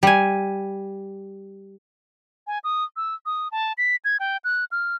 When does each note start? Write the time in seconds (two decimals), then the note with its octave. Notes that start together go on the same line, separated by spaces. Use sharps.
0.03 G3 G#5
2.47 G#5
2.64 D#6
2.96 E6
3.26 D#6
3.52 A5
3.78 B6
4.05 G#6
4.20 G5
4.44 F#6
4.72 F6